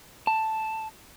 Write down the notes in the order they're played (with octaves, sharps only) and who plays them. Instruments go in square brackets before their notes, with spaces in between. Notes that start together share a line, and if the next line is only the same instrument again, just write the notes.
[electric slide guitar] A5